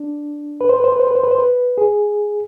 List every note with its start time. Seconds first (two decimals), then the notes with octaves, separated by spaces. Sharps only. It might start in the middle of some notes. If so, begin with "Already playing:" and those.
Already playing: D4
0.61 B4
0.69 C5
0.76 B4
0.84 C5
0.92 B4
0.99 C5
1.07 B4
1.15 C5
1.23 B4
1.31 C5
1.38 B4
1.78 G#4